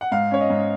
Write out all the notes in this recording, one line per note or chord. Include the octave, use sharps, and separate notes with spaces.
F#5
G#2 F5
C#4 C#5
D#5
G#2